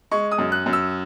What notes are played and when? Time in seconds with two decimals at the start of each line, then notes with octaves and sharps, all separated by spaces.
0.11 G#3 C#6
0.31 D#6
0.38 F#2
0.52 F#6
0.66 F#2
0.73 E6